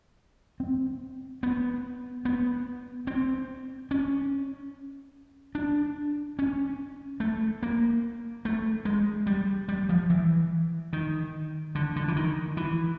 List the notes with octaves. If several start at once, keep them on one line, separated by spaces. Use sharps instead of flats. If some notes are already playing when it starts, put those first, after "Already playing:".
C4
B3
B3
C4
C#4
D4
C#4
A3
A#3
A3
G#3
G3
G3
F3
E3
D#3
D3
D3
E3
D#3
E3